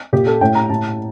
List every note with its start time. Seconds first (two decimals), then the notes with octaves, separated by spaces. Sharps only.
0.13 A#2 G4
0.27 A4
0.41 A2 G5
0.55 A#5
0.69 A2 A5